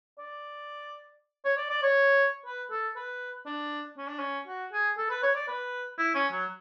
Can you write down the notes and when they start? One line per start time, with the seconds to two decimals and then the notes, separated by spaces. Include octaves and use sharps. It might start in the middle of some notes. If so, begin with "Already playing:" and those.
0.19 D5
1.45 C#5
1.57 D5
1.70 D5
1.83 C#5
2.46 B4
2.71 A4
2.96 B4
3.46 D4
3.97 C#4
4.08 D4
4.19 C#4
4.47 F#4
4.73 G#4
4.98 A4
5.10 B4
5.23 C#5
5.35 D5
5.48 B4
5.98 E4
6.15 C#4
6.32 F#3